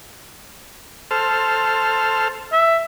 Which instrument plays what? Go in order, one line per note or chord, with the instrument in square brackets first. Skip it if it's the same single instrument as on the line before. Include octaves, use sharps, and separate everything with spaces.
[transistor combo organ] A4 C5 F6
[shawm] E5